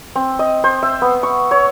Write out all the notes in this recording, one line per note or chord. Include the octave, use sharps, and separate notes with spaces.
C4
D#5
C5
E5
B3
C#6
C#5